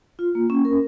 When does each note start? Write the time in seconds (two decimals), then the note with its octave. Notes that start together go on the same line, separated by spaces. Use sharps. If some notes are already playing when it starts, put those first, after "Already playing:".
0.19 F4
0.35 A#3
0.50 C#4
0.65 A#4